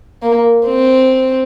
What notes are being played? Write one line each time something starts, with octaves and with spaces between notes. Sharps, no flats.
A#3
C4